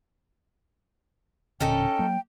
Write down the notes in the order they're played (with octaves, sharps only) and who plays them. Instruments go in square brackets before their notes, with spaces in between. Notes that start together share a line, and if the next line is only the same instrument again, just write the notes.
[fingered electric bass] E1 A#2 D3 [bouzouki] C#4 D#4 A4 [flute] G5
[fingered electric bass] F#3 A#3